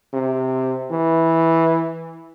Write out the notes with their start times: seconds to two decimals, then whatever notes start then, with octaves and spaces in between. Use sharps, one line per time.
0.13 C3
0.91 E3